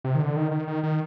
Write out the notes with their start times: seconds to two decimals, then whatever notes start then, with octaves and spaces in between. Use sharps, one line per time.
0.04 C3
0.15 D#3
0.20 D3
0.36 D#3
0.51 D#3
0.68 D#3
0.83 D#3